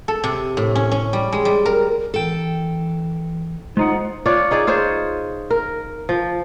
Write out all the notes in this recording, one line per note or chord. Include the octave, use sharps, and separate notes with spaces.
A4
C3
A2
C#4
C#4
G3
G#3
G3
A#4
E3 A4 G5
G#3 D#4 F4 C5 F#5
D4 F4 C#5 D5
D#4 G#4 D5
F4 G#4 C5 C#5
A#4
F3